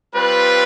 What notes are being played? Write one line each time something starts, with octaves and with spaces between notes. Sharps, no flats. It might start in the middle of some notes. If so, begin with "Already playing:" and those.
G3 C4 F4 B4